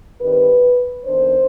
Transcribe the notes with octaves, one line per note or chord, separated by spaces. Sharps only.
G2 D#3 G3 C4 B4
F2 D#3 B3 D4 C5